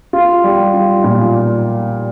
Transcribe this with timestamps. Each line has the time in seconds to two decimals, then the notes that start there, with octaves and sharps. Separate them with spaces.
0.13 F4
0.44 G3
0.74 F4
1.04 A#2